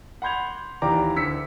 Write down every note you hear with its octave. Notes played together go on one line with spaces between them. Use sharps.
F#5 B5 C6 G6 G#6 F7
D#2 E3 G4 D5 A#5 D6
D2 E6 B6 C#7